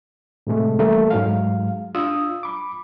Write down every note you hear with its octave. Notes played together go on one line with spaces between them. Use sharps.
A2 C3 G#3 A3
E3 G3 A3 A#3
G#2 F#3 G#3 F5
D4 F4 D#6 E6
B5 D6